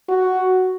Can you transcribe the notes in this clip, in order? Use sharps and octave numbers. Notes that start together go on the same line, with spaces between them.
F#4